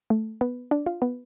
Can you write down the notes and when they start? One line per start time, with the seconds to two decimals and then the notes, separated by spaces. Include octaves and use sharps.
0.10 A3
0.41 B3
0.71 D4
0.86 F4
1.02 B3